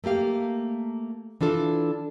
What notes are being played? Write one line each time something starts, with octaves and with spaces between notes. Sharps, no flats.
A3 A#3 G4 F5
E3 D4 F4 A4